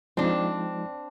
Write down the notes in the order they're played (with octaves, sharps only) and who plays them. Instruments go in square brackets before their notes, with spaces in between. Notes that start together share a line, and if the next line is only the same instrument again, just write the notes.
[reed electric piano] F3 G#3 D#4 [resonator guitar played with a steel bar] C4 D4